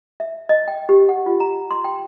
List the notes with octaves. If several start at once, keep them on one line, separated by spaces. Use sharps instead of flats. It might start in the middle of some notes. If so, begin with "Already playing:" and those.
E5
D#5
G5
G4
F#5
F4
A#5
C6
G5